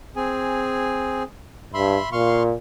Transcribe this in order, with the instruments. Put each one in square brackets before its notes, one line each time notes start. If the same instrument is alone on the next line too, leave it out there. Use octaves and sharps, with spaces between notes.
[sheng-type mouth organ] C4 G#4 G#5
[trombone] G2 [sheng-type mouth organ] E5 B5 C6
[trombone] A#2 [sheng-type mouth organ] F5 C6 C#6